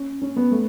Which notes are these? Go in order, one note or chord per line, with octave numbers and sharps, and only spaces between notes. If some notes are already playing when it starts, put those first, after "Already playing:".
Already playing: C#4
C#4
B3
A3